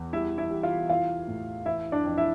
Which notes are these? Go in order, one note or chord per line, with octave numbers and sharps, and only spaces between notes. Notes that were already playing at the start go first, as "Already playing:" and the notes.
Already playing: E2
G3 E4 E5
E4 E5
G3
F4 F5
E3 F4 F5
A2
E3 E4 E5
D4 D5
F2
E4 E5